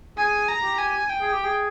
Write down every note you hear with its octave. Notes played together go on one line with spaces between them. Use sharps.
G#4 G#5
A#5
G4
G#5
G5
G#4
G4
G#4